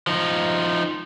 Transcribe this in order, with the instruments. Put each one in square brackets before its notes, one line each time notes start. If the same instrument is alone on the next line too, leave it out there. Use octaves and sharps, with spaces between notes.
[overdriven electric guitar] F3 D#4